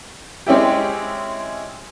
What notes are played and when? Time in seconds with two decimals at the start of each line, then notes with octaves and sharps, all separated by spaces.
0.47 G#3 C4 C#4 E4 G4